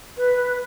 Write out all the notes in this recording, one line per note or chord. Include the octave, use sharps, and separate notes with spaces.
B4